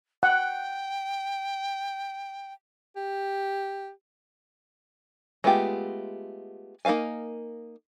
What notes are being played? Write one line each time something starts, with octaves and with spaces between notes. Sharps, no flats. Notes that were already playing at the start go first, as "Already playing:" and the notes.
F#5 G5
G4
G#3 A3 B3 F4 G4
A#3 D#4 C5 F5 G#5